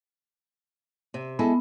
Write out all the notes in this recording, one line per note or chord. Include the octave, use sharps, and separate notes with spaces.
C3
G#3 B3 E4 A4